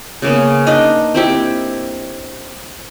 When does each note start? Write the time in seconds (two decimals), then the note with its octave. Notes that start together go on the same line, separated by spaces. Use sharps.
0.22 C#3 A#3 B3
0.67 D4 D#4 D#5
1.15 C4 E4 G4